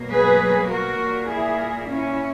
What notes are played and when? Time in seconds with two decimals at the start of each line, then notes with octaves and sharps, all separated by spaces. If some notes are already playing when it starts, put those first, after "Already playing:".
Already playing: B2 F#3 A#3
0.11 G#4 B4
0.70 F#4 A#4
1.00 A#2 A#3
1.29 E4 G#4
1.88 C#4 E4